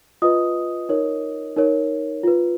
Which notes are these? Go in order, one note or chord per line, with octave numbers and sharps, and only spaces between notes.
F4 B4 D#5 D#6
D#4 A#4 C#5
D#4 A#4 C#5
F4 B4